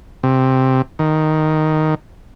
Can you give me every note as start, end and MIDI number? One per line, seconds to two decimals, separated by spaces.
0.23 0.82 48
0.99 1.95 51